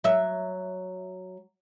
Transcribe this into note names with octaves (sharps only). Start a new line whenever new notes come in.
F#3 E5